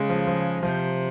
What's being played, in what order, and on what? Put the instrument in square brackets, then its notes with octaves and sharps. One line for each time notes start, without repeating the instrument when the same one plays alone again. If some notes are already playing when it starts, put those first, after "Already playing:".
Already playing: [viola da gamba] C#3 [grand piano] G#3
[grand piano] F3
F3
[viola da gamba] C3 [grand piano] F3